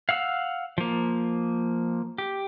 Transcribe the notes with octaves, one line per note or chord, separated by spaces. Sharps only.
F5 F#5 E6
F3 A#3
G4